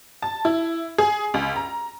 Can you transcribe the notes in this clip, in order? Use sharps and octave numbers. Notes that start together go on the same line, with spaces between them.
A5
E4
G#4
C#2
A#5